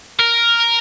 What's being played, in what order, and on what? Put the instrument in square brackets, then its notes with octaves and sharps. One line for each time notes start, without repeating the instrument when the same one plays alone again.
[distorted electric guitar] A#4